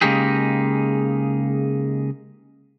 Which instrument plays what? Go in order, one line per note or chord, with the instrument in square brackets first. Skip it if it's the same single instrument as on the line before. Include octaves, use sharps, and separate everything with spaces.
[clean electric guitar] C#3 G#3 A#3 D#4 G4 G#4